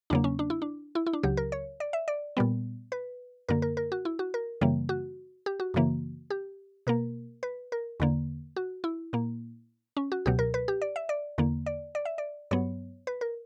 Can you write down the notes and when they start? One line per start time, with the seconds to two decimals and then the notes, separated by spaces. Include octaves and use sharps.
0.10 E2 C#3 F#3 A#3 D4
0.24 C#4
0.39 D4
0.50 E4
0.62 D4
0.95 E4
1.06 E4
1.13 D4
1.23 C#2 C#3 F#3 G4
1.37 A#4
1.52 C#5
1.80 D5
1.93 E5
2.08 D5
2.37 A#2 G3 B3
2.92 B4
3.49 F#2 D3 A#3 A#4
3.62 A#4
3.77 A#4
3.92 F#4
4.05 E4
4.19 F#4
4.34 A#4
4.61 F#2 C#3 E3 G3 A#3
4.89 F#4
5.46 G4
5.60 F#4
5.74 F#2 C#3 E3 A#3
6.30 G4
6.87 B2 A#3 A#4
7.43 B4
7.72 A#4
8.00 E2 D3 A#3
8.56 F#4
8.84 E4
9.13 A#2 A#3
9.97 C#4
10.12 F#4
10.26 C#2 B2 F#3 G4
10.39 A#4
10.54 B4
10.68 G4
10.82 D5
10.96 E5
11.09 D5
11.38 E2 D3 A#3
11.66 D5
11.95 D5
12.05 E5
12.18 D5
12.51 G2 F#3 B3 C#5
13.07 B4
13.21 A#4